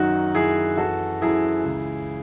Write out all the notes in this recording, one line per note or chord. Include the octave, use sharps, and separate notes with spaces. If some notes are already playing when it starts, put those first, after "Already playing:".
Already playing: F#2 D#3 F#3 D#4 F#4
F#2 D#3 F#3 E4 G#4
F#2 E3 F#4 A4
F#2 E3 E4 G#4
C#2 C#3 E3